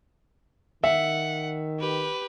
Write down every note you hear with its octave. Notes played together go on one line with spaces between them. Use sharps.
D#3 E5 F#5
G4 B4